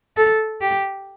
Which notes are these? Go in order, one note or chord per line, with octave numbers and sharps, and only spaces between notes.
A4
G4